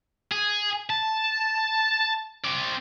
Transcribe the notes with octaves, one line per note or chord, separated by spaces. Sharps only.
G#4
A5
C4 D5